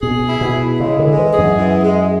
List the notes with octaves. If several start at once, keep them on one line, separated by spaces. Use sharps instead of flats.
B2 G#4
E4
B2
E4
C#3 G#3
D3
G#3
E3
G#4
F#2
E3
G#3